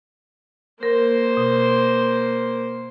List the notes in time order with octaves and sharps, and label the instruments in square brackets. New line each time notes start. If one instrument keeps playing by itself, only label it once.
[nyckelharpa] A#3 C5 [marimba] A#4
[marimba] B2